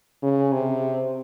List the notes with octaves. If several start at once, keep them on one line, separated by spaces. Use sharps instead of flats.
C#3
C3